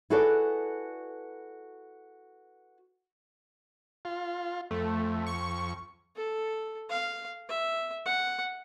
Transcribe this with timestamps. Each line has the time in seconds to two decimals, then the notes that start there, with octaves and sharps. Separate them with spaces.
0.10 E4 F#4 G#4 A4 B4 D5
4.05 F4
4.71 F2 A3
5.27 C#6
6.16 A4
6.90 F5
7.49 E5
8.06 F#5